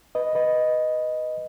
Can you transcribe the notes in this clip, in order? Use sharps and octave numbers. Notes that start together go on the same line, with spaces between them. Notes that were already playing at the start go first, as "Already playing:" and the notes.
B4 D#5
B4 D#5